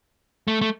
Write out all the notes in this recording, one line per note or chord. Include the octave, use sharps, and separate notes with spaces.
A3
A3